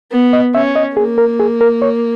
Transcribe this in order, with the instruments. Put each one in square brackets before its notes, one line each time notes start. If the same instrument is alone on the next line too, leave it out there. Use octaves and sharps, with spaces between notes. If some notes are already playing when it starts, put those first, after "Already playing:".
[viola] B3
[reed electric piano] D#5
[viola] C#4 [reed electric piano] E5
[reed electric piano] D#5
[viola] A#3 [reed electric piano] G#4
[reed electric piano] A#4
G#4
A#4
C#5